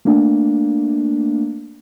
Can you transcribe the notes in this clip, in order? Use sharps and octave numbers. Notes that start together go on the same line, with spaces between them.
A3 A#3 D4